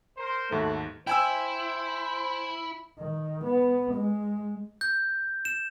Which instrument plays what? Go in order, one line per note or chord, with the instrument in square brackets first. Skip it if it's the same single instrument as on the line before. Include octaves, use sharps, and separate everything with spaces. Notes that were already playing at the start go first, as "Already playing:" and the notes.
[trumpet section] A#4 C5
[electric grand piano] D#2 G#2 [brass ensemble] A3 [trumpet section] F#4
[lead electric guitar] E4 [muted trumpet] C5 [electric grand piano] G5 G#5 E6
[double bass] D#3
B3
G#3
[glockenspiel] G6
E7